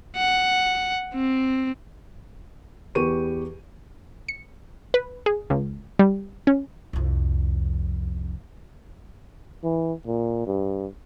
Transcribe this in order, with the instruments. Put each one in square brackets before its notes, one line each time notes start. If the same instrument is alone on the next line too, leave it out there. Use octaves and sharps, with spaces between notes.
[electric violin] F#5
C4
[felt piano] E2 G4 B4 C#6 D#7
[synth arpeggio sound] C#7
B4
G#4
C#2
G3
C#4
[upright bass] C2 F2
[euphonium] E3
A#2
G2